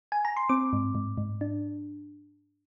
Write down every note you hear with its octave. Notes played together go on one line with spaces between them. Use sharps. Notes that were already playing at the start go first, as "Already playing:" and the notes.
G#5
A#5
C6
C4 D6
G#2
G#2
G#2
D4